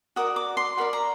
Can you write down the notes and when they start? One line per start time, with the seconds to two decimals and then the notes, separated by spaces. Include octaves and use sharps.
0.16 F#4 A#4 D5 D#6
0.36 D6
0.57 C6
0.77 F#4 A#4 D5 B5
0.93 A#5